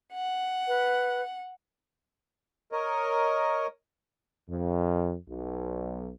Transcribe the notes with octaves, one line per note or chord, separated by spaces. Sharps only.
F#5
B4
A#4 C#5 D#5
F2
B1